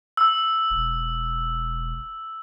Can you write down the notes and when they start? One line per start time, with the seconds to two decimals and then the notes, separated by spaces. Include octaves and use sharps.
0.17 E6
0.70 E1